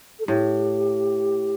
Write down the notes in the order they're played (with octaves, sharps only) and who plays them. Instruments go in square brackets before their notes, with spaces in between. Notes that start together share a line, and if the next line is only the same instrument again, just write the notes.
[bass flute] A4
[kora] A2 [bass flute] G4